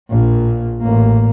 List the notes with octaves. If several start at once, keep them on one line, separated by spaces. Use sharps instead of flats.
A#1 A#2
A1 A#3